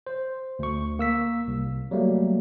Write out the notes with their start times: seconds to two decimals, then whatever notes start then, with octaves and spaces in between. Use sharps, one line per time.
0.07 C5
0.59 D2 C#6
0.99 A#3 E6 B6
1.48 C2
1.91 F#3 G3 A3 A#3